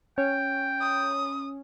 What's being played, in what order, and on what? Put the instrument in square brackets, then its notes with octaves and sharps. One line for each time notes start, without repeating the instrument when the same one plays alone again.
[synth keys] C#4 [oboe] G5
[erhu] D#6